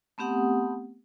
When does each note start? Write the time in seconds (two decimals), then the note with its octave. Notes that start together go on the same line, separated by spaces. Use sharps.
0.18 A3 B3 C4 G4 F#5 D#6